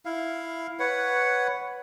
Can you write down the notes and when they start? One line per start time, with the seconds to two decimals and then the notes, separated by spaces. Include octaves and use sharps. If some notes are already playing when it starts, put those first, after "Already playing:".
0.05 E4 F5
0.79 B4 C#5 F#5